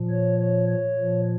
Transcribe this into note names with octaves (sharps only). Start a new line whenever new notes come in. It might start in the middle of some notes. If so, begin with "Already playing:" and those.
Already playing: A#2 F3
C#5
C#5
C#5
A#2 F3